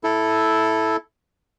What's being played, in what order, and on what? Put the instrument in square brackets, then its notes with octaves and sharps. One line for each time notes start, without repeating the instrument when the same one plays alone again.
[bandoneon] E4 A4